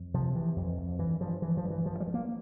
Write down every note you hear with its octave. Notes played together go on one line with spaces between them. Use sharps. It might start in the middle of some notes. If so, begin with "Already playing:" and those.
Already playing: F2
C3 F3
C3 E3
F2
F2
G2 E3
G2 F3
G2 E3
F3
G2
E3
G2 F3
G3
G2
A#3